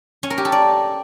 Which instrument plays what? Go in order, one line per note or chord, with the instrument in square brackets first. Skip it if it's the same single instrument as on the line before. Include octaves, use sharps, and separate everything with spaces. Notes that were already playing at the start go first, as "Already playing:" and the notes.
[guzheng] C#4
A#4
G4
A4
D5